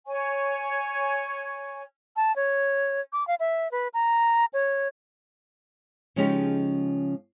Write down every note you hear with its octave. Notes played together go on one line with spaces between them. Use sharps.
C#5 G#5 C#6
A5
C#5
D6
F5
E5
B4
A#5
C#5
C#3 F3 G#3 C#4 D#4 G4